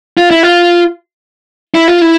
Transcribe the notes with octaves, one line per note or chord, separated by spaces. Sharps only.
F4
E4
F4
E4
F4
E4